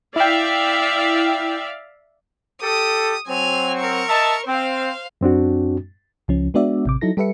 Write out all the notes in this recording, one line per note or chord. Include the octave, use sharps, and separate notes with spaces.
E4 D5 E5 F5 G5
G4 A4 D#6
F#3 C4 G#5 F7
A#4 C#6
D#5 E5 A5
C4 C5 F5
F#2 C4 D4 F#4
C#2 F3 C#4
G#3 B3 D4 F#4 D5 E5
A1 C3 D6
F#3 D#4 E4 A4 A#6
G3 G4 A4 B4 E5 C#7